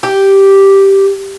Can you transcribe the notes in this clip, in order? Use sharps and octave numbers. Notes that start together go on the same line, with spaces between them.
G4